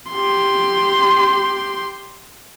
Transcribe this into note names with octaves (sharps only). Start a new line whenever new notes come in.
G4 C6